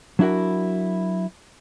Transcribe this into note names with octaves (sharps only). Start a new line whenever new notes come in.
F#3 D4 E4 F#4 A#4